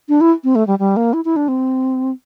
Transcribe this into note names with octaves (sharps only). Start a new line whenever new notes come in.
D4
E4
C4
A3
G3
G3
A#3
E4
E4
D4
C4